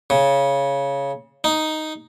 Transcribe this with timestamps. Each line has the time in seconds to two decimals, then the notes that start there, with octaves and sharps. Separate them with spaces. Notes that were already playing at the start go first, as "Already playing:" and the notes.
0.10 C#3
1.44 D#4